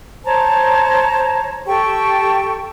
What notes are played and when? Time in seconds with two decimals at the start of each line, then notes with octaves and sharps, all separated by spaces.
0.24 C5 C#5 A5 A#5
1.66 G4 A4 G5 C#6